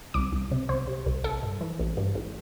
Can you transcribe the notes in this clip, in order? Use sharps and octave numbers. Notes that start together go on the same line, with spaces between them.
C2 D6
C2
C3
C2 C5
C3
C2
A1 A4
G2
E3
A1
G2
A1